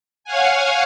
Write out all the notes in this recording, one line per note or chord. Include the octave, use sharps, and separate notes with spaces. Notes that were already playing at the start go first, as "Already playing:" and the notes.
C#5 F5 F#5 G#5